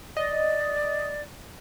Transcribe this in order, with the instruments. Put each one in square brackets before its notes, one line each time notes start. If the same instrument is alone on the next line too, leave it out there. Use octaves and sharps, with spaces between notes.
[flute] D5 [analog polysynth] D#5